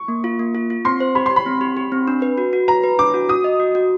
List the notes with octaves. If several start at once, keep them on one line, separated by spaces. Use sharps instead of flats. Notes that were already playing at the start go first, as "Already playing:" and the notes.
Already playing: C#6
A#3
F4
A#3
F4
F4
C4 C6
C5
G4 B5
C6
G4
B5
C4
G4
G4
C4
D4
B4
F#4
F#4
B4 A#5
B4
D4 D6
F#4
F#4 D#6
D#5
F#4
F#4